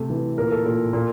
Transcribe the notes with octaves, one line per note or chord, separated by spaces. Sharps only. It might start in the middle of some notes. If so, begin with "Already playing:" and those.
Already playing: C3 A3
E3
A#2 A#4
A4
A#2 A#4
A#2